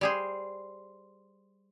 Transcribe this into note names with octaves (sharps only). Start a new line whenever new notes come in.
G3 G#4 C5